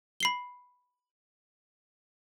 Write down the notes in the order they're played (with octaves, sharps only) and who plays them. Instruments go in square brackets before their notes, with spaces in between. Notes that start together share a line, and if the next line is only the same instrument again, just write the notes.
[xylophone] B5 C7 G7